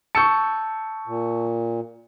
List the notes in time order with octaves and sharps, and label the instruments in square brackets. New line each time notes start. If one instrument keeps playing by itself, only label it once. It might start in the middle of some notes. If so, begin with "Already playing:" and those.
[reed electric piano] A5 E6 G6 [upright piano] C#6 C#7
[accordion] A#2